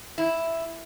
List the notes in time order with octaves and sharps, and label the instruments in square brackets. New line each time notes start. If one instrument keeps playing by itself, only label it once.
[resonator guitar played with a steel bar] E4